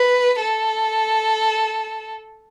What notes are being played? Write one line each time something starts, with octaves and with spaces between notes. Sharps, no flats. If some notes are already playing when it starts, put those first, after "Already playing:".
Already playing: B4
A4